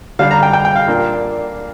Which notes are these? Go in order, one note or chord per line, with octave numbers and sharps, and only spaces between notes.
D3 G3 D4 F5
A#5
G5
G5
G5
F5
A#2 A#3 D4